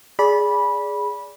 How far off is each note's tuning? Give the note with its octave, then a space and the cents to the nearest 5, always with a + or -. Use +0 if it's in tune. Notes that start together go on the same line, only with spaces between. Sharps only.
G#4 +0 D5 -20 B5 -15